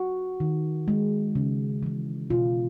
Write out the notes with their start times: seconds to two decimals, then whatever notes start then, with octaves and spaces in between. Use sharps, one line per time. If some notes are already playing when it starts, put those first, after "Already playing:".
Already playing: F#4
0.40 D#3
0.88 G#3
1.35 C#3
1.83 E3 G#3
2.30 B2 F4